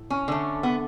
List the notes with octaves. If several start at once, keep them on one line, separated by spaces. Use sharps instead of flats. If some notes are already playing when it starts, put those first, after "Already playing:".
Already playing: A2
C#4
D3 A3
B3